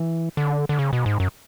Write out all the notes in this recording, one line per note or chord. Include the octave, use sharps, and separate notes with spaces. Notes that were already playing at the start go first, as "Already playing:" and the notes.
Already playing: E3
D3
D3
C#3
B2
G#2
F#2